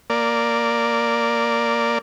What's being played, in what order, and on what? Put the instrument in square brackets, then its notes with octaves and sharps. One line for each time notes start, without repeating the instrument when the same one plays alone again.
[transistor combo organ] A#3 D5